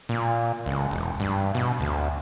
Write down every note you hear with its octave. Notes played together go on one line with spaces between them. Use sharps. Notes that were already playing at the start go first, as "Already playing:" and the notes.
A#2
C#2
E1
G2
B2
D2